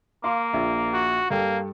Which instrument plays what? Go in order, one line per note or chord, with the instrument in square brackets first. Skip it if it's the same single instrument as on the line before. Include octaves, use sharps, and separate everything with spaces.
[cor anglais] A#3 [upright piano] F5 C6 D6
[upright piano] A#1 E5
[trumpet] F#4
[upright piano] G2 A4 G5 [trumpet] A#3